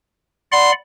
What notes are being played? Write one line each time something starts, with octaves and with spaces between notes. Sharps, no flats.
D5 F#5 B5 C6